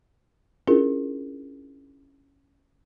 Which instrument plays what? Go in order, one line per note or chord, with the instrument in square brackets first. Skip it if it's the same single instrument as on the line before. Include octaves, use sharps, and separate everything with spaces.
[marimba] C#4 D4 E4 F4 G#4 A#4